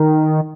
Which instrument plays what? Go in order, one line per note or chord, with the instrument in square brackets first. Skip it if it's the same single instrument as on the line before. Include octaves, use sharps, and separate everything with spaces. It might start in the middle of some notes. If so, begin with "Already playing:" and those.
Already playing: [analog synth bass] D#3